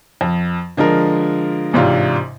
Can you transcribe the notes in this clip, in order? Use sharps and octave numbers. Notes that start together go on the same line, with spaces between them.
F2
D3 F3 G#3 A#4
A1 G#2 C3 D4 F4